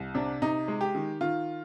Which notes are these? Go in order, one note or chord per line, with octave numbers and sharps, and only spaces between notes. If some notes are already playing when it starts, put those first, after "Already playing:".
Already playing: C2
C3 D4
C3 D#4
G#3
G4
D#3
D#3 F4